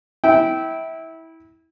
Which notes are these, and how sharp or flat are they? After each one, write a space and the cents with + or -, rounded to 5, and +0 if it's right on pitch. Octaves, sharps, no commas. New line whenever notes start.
E4 -20 G5 -15